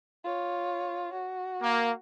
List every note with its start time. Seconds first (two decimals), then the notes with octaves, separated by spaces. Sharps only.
0.24 F4 C#5
1.13 F#4
1.61 A#3